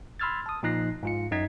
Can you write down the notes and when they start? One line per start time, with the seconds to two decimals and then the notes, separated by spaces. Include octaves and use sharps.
0.20 B5 C6 E6 F6 G#6 A6
0.46 A5 D#6
0.63 A#2 F3 D#4 F#6 A#6 C7
1.03 G#2 F4 C#7
1.31 F#2 D#4 D#5 G#6 B6